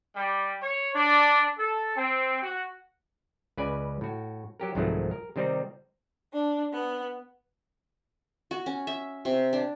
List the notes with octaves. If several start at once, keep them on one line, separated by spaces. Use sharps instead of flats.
G3
C#5
D4
A4
C4
F#4
C#2 C#3 B4 D5 G#5
A2 F#4
F#3 G4 A#4
C2 G#2 D#3 F3 F#3 A3
A#4
C3 D#3 G3 C4 D#4
D4
B3
F#4
C#4
E5
C3
D4